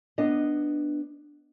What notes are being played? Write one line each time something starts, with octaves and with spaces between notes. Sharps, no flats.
B3 D4 D#5